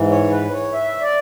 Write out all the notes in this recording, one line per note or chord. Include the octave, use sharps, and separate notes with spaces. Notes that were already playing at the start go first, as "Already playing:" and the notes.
Already playing: G#2 E3
C#5
B4
C#5
E5
D5